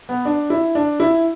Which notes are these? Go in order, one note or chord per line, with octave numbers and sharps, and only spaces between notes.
B3
D4
E4
D4
E4